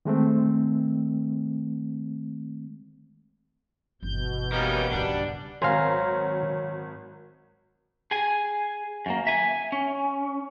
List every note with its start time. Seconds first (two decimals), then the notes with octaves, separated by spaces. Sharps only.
0.05 D#3 G#3 A3 C4
4.03 G1 B2 E3 G6
4.52 G3 A#3 B3 C#4 D#4
4.91 G2 C#3 G3 D4 F#5
5.62 G#1 F#3 F5 G#5 A#5 C6
8.11 G#4 G#5
9.06 F#2 A#3
9.27 E5 G#5
9.72 C#4